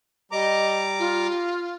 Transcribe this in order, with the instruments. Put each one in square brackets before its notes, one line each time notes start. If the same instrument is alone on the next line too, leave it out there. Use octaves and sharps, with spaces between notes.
[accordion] G3 A#5 D6 [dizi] D#5
[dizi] F4